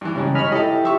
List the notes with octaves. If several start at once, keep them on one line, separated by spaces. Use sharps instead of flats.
G2 E3
G#2 C#3 G3 C#4
C#5 D#5 G#5 B5 F6
E4 G4 A4 D#5
F3 E5 C#6